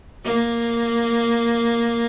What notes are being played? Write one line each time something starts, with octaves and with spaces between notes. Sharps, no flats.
A#3